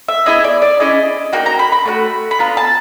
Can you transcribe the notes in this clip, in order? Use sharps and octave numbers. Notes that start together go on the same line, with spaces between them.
E5
B3 E4 G#4 D#5
D5
D5
C#4 E4 G#4 D#5
A#3 D#4 F#4 G5
A#5
B5
B5
A3 D4 F#4
B5
B3 D4 F4 A#5
A5